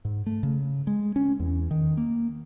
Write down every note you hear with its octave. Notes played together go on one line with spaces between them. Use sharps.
G#2
A3
C#3
G#3
C#4
E2
D#3
A#3